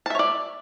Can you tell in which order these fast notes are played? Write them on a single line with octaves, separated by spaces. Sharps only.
A5 E5 C#5 D5